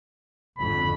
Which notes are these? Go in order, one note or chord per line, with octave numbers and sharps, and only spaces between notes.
G#1 F2 D3 B5